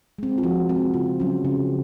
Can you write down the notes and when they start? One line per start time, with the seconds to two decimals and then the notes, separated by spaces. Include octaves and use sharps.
0.18 G#3 C4
0.38 F4
0.43 F3 F#4
0.69 G#3 C4
0.94 C#3 F4
1.20 F#3 C#4
1.45 C#3